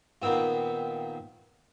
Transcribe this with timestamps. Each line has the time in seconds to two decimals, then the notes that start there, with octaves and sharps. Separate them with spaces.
0.22 A#2 D#3 B3 C4 F4